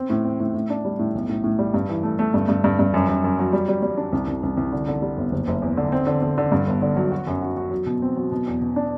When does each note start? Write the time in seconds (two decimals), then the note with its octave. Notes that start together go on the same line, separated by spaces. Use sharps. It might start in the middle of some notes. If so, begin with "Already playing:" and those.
Already playing: C4
0.10 A2
0.24 C4
0.40 A2
0.54 A2
0.70 D4
0.85 G3
0.99 A2
1.15 B1
1.29 A2
1.44 A2
1.59 G3
1.74 G2
1.89 E3
2.03 A3
2.19 A3
2.34 G2
2.48 G2
2.64 G2
2.79 G2
2.94 F#2
3.09 F#2
3.24 F#2
3.39 F#3
3.53 G3
3.68 G3
3.82 G3
3.97 D4
4.12 C2
4.27 C2
4.43 C2
4.57 C2
4.72 D3
4.88 D3
5.02 G3
5.17 G1
5.32 F#1
5.47 F#1
5.62 E2
5.77 D3
5.92 C4
6.07 D3
6.22 D3
6.38 D3
6.52 G2
6.67 G1
6.82 D3
6.96 F#3
7.12 F#4
7.27 F#2
7.42 F#4
7.57 F#4
7.71 F#3
7.86 B2
8.02 C4
8.17 F#3
8.31 B2
8.47 E2
8.61 B2
8.76 D4